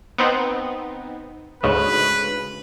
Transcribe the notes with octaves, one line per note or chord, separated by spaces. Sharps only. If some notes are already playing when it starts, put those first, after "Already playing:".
B3 C4 D#4
D2 G#2 C#3 B4